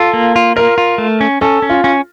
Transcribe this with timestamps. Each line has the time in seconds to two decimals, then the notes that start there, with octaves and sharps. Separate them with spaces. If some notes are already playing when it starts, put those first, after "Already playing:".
Already playing: F4 A4
0.14 A#3
0.36 F4
0.56 F4 A#4
0.78 F4
0.98 A3
1.21 C#4
1.41 C#4 A4
1.62 C#4
1.69 F4
1.84 C#4